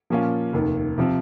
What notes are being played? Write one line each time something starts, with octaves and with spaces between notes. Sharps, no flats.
A#2 F3 A#3 C#4 F4
F1 D#2 D#3
C3 F3 C4